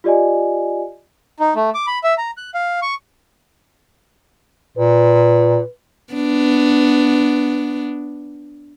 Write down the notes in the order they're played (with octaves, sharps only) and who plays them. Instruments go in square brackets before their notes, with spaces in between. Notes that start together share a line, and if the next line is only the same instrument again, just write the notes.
[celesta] F4 G4 D5 D#5 G#5
[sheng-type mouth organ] D#4
A3
D6
B5
E5
A#5
F#6
F5
C#6
[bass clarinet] A#2 [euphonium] B4
[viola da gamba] B3 D4